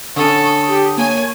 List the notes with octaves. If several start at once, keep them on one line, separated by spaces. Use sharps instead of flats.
D3 C#4 A4 C#6 D#6
G4
A#3 C#5 G#5